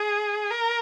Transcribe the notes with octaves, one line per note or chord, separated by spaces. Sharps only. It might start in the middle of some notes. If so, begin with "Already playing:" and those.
Already playing: G#4
A#4